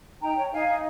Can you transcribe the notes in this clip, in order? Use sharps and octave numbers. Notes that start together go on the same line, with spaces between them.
D#4 G5 A#5
C#5
D#4 F5 G#5
D#4